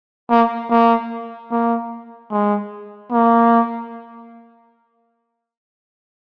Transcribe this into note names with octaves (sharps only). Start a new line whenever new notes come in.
A#3
A#3
A#3
G#3
A#3